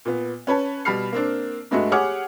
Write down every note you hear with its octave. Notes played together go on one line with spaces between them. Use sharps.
A#2 B3
C#4 B4 C#5 A5
B2 G3 B5 F6 C7
A#3 C4 D4
G2 G#3 A3 F#4
G4 G#4 C#5 F#5 D6 F6